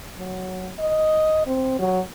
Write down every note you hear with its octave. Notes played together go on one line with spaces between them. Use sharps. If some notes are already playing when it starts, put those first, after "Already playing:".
F#3
D#5
C4
F#3